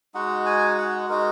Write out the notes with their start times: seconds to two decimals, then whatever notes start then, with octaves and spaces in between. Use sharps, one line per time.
0.14 G#3 D#4 F#4 F#5
0.46 G#5
0.78 F#5
1.09 G#3 D#4 F#4 A#4